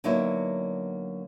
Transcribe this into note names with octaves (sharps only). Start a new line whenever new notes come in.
D3 F#3 A#3 B3 D#4 E4